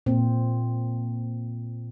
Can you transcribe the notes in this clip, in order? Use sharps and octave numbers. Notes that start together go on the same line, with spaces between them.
A#2 C4